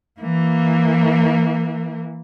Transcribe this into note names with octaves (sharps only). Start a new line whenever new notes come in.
E3 A#3